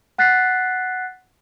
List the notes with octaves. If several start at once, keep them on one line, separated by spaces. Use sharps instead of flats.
F#5 F#6 A6 B6 C7